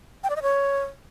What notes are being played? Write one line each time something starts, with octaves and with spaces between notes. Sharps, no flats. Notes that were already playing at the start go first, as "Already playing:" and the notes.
G5
D5
D#5
C#5